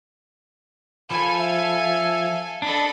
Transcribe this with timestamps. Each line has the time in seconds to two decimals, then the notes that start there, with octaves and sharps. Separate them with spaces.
1.11 F3 A4 F5 G#5 B5
1.39 E5
2.62 D4 A4 D#5 B5